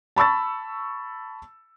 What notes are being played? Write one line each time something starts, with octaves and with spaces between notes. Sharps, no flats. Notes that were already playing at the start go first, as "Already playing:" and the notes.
A5 B5 C#6 E6 A6